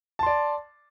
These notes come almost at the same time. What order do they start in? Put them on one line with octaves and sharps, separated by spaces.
A5 C6 D5